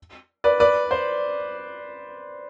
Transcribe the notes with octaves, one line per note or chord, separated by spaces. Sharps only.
B4 D5
B4 D5
C5